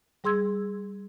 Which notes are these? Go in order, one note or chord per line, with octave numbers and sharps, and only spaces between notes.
G3 G#4 C6 E6 G#6